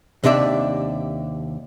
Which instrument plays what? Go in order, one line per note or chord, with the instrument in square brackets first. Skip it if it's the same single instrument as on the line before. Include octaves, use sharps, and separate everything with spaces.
[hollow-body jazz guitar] D#2 C3 D4 D5 E5